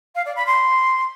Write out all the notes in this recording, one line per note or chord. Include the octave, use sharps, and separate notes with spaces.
F5
D5
B5
C6